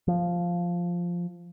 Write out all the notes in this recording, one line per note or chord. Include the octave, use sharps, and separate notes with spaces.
F3